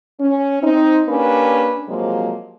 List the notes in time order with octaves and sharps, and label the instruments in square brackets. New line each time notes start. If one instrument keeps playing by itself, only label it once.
[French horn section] C#4
C4 D#4
A#3 C#4 D4 G4 B4
C3 F3 F#3 G#3 A#3